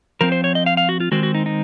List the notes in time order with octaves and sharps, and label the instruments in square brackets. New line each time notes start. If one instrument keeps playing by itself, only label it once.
[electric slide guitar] F3 C4 A#4
C5
C#5
D#5
F5
F5
F#4
F4
D#3 G#3 C4 F#4
F#4
D#4
D#4